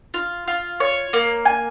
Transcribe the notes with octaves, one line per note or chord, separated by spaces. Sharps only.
F4
F4
C#5
A#3
G#5